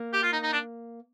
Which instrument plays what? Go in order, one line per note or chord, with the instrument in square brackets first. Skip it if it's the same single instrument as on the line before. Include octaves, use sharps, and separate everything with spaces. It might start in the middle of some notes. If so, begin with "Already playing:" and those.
Already playing: [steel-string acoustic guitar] A#3
[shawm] G4
F4
D#4
D#4
D4